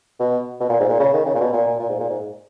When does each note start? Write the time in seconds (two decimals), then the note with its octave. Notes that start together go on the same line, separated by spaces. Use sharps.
0.20 B2
0.60 B2
0.69 A#2
0.80 G#2
0.89 A#2
0.99 C#3
1.14 D#3
1.26 C#3
1.35 A#2
1.40 B2
1.53 A#2
1.67 A#2
1.79 A#2
1.89 G#2
2.00 A#2
2.10 G#2